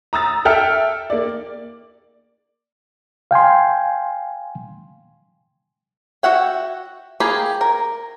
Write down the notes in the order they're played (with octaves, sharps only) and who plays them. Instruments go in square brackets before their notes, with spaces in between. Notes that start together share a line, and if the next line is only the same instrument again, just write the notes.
[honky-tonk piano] A#5 D#6 E6 A6
A4 E5 G5 E6 F6
A#3 D5
[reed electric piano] F5 G5 G#5 C6
[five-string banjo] F#4 E5 F#5 G5
A#3 G4 G#4 A#5 B5
A#4